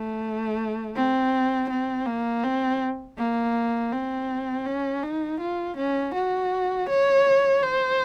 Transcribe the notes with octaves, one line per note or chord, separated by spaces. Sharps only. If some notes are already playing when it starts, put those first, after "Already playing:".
Already playing: A3
C4
C4
A#3
C4
A#3
C4
C#4
D#4
F4
C#4
F#4
C#5
C5